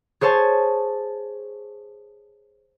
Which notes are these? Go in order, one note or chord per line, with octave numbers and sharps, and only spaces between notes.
G#4 C5 C#5 A5